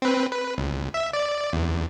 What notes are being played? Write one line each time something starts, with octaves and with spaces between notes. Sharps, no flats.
C4 B4
B4
C#2
E5
D5
E2